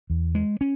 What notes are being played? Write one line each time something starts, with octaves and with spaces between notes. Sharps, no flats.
E2
G#3
C#4